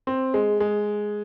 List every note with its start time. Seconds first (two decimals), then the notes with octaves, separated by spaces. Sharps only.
0.07 C4
0.34 G#3
0.60 G#3